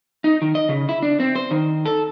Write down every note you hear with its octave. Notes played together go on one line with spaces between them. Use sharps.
D#4
D#3
D#5
C#3
E4
D4
C4
C5
D#3
A4